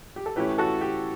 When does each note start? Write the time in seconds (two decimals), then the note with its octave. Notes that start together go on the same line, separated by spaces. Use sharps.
0.16 G4
0.26 A4
0.36 A2 E3 A3 C#4 G4 B4
0.58 F#4 A4
0.81 G4